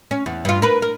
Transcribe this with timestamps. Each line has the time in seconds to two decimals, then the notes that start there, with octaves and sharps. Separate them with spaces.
0.11 C#4
0.26 E2
0.45 G2 F4
0.62 A#4 B4
0.82 A#4